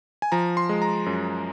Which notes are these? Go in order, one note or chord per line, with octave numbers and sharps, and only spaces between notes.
G#5
F3 A#5
C6
G#3
A#5
F#2